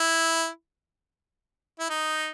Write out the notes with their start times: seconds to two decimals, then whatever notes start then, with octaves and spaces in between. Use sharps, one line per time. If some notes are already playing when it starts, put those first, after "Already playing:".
Already playing: E4
1.80 E4
1.89 D#4